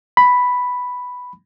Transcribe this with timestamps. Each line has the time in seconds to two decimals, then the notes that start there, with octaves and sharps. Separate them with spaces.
0.17 B5